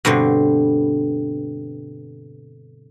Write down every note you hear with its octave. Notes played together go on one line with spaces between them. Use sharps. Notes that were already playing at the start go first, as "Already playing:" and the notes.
G2 B2 D3 C4